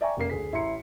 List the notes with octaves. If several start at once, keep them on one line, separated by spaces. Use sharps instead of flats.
D5 E5 G5 G#5 A#5 C#6
F1 C#3 A#3 C7
D2 G#4 B6
A1 E4 A#5 C6 C#7